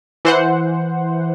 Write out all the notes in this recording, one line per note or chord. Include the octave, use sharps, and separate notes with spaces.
E3 C5 F#5